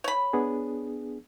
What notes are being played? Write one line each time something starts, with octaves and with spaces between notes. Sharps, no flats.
C#5 B5
B3 D4 G#4